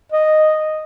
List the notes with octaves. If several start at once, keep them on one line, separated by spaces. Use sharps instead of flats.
D#5